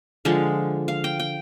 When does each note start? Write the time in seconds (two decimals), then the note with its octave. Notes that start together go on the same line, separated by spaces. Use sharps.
0.25 D3 F3 G#3 F5
0.88 F5
1.04 G5
1.20 G5